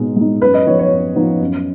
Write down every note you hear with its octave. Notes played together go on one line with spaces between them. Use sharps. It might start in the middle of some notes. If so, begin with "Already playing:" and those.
Already playing: B2 G#3 D#4
G#3 D#4
F#2 B4
D#5
F3 B3 D#4 C#5
C#5
F#2
F3 B3 D#4
F#2